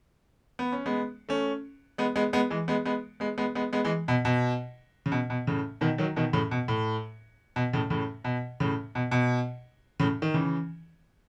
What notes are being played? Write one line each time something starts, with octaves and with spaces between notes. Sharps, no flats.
B3
C#4
G#3 B3
A3 C#4
G#3 B3
G#3 B3
G#3 B3
E3 G#3
G#3 B3
G#3 B3
G#3 B3
G#3 B3
G#3 B3
G#3 B3
E3 G#3
B2
B2
C#3
B2
B2
A2 C#3
B2 D#3
D#3 F#3
B2 D#3
A2 C#3
B2
A2
B2
A2 C#3
A2 C#3
B2
A2 C#3
B2
B2
A2 C#3
D#3
C#3 E3